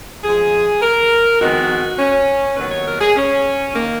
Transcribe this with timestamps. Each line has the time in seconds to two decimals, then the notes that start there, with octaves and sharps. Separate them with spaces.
0.23 F2 F3 G#3 G#4
0.82 A#4
1.39 F2 D#3 G#3 B3 F#4
1.98 C#4
2.57 D#2 D#3 F#3 B3 B4
2.71 C#5
2.86 A#4
3.00 G#4
3.16 C#4
3.74 D#3 A#3